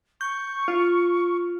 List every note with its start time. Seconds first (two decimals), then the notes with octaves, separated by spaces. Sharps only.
0.21 C#6 G6
0.68 F4